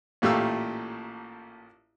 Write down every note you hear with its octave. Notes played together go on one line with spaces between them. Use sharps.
A1 A#2 A3 G4 F5 E6